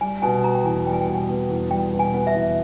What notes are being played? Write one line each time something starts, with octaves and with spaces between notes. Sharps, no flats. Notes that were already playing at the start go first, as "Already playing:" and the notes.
G3 G#5
B2 G#5
B3 A#5
G5
E2 G#5
G3 G5
G#5
G5
B2
G5
B3
E2
G3 G5
B2
G#5
B3
E5
E2